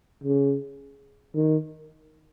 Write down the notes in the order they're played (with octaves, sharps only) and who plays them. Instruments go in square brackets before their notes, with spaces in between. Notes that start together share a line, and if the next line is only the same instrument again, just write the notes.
[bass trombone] C#3
D#3